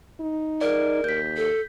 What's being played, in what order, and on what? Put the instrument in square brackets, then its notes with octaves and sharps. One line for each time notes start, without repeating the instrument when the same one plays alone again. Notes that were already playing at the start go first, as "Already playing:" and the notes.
[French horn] D#4
[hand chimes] G#4 D5 [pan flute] A#4
[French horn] D#2 [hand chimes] G6 B6
[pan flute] A4